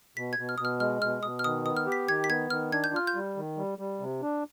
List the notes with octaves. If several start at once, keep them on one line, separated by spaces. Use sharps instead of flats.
B2 B6
G#6
B2
F6
B2 D#6
F6
G#3 F6
B2 F6
B2 D#6
F6
D#3 D#6
B3 D#6
F6
G4
B6
D#3 G#6
B6
B3 G#6
D#3 F6
D4 G#6
G6
F4 F6
G6
G3
D#3
G3
G3
C3
D4